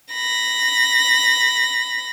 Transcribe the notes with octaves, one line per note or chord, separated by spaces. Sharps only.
B5 A#6